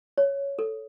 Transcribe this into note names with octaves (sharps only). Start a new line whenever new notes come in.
C#5
A4